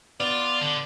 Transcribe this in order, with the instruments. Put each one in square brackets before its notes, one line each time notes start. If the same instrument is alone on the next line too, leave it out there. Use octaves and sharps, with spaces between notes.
[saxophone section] B3 D5 [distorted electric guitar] F4
[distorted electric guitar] D3